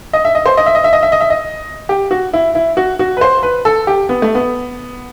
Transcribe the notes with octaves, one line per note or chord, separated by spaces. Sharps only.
D#5
E5
D#5
C5
D#5
E5
D#5
E5
D#5
E5
D#5
E5
D#5
G4
F#4
E4
E4
F#4
F#4
B4
C5
B4
A4
G4
B3
A3
B3